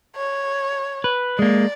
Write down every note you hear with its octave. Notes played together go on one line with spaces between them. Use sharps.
C#5
B4
G#3 A#3 D5